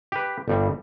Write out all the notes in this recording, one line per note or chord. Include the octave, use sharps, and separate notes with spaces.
G4 B4
G1 G2 G3